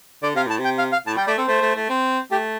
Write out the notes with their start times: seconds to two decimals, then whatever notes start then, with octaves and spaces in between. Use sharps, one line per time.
0.23 D3 D5
0.35 C3 F5
0.47 A2 A5
0.59 C3
0.64 G5
0.78 F5
0.92 F5
1.07 A2 A5
1.17 G3 G5
1.27 A3 D5
1.38 C4 A4
1.47 A3 C5
1.62 A3
1.76 A3
1.89 C4
2.31 A3 G4